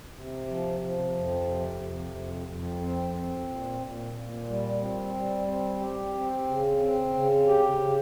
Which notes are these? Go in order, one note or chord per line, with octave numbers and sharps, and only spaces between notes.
C3
F3
F3
F2
C3
F2
F2
F2
C4
C4
A#2
A#2
A#2
G3
C4
G3
C4
G4
C4
C#3
C4
C#3
G4
C#3